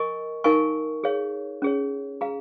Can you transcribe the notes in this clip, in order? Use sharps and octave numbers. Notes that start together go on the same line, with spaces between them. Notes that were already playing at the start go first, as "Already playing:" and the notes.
Already playing: A#4 D#5 G#5 C#6
D#4 A#4 F5 G#5 C#6
G#4 C#5 F5
C#4 G#4 C#5
G#4 F5 A#5